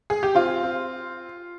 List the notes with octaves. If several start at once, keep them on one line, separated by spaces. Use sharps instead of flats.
G#4
G4
C4 F4
C4